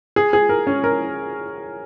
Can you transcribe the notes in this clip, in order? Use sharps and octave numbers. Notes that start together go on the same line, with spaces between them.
G#4
G#4
A#4
C#4
A#4